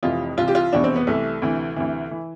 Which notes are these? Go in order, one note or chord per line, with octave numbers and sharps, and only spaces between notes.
F1 F2 C3 E3 F4
C2 C3 E3 F4
G4
F4
F1 E2 B2 D4
C4
B3
C2 C3 E3 A3
D2 C3 E3
D2 C3 E3
E3